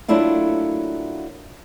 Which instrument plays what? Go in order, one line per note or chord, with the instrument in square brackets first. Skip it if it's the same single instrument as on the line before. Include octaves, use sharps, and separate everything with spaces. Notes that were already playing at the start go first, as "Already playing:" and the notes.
[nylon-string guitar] F#3 A3 A#3 D4 E4 F4